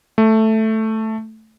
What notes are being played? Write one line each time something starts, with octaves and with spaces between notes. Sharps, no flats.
A3